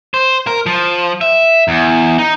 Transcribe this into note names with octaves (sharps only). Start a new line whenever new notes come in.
C5
A#4
F3
E5
E2
D#4